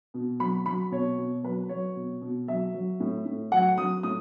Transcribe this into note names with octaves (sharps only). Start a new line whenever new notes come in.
B2
F#3 B5
F#3 B5
B2 C#5
B2
F#3 B4
F#3 C#5
B2
B2
F#3 E5
F#3
A2
A2
F#3 F#5
F#3 D#6
A2 D#6